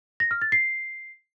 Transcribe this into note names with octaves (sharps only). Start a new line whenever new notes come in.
A#6
F6
A6
C7